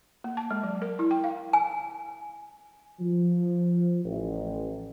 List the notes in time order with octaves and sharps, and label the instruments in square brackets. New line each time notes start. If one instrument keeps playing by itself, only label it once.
[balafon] A#3
A5
G#3
F#3
A#4
E4
G5
F5
[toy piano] G#5
[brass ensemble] F3
A1